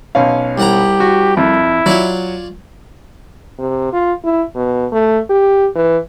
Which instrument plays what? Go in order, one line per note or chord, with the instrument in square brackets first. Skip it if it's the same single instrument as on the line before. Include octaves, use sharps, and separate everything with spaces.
[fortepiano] B1 C#4 F5
[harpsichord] C2 F#5 A#5 [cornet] G4
[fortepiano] F#4
[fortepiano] F2 [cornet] E4
[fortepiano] F#3 [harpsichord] F4 C#5 D5
[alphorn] C3
F4
E4
B2
A3
G4
E3